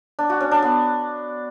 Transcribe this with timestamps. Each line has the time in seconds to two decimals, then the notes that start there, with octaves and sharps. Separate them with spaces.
0.19 D4
0.30 F#4
0.40 C#4
0.51 D4
0.62 B3